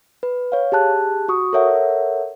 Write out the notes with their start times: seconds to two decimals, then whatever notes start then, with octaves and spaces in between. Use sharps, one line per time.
0.23 B4
0.52 C#5 F5
0.72 G4 G#4 A5 F#6
1.28 F#4 C#6 D#6
1.53 A4 A#4 C#5 E5 F#5